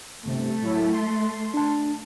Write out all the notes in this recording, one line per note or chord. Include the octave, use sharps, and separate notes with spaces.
G1 C3 A3
A2 F#3 E4
C6
D4 A5